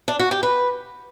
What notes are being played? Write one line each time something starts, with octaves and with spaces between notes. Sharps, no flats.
D4
F#4
G4
B4